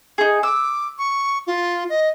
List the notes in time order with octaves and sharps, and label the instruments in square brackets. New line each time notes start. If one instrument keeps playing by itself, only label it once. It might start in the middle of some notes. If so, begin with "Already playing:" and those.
[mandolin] D#4 G#4
[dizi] D6 [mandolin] E6
[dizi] C#6
F4
D#5